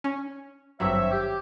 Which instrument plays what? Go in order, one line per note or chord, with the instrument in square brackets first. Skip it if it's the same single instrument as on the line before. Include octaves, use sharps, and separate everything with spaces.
[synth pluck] C#4
[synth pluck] G#1 G2 F#3 [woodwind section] C4 C#5 E5
[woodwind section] G4